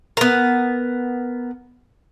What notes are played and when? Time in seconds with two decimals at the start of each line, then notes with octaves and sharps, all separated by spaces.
0.17 B3 A#4